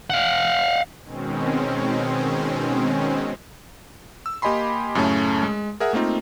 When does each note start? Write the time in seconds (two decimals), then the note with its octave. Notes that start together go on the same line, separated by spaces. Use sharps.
0.10 F5 F#5
1.04 B2 D#3 G#3 C4 C#4
4.26 E6
4.42 A#3 G4 D#5 G#5 B5 C6
4.95 F#2 A2 C#3 A3 C#4 A5
5.43 G#3
5.80 G#4 A#4 E5 F#5
5.93 A3 A#3 C4 D#4 F4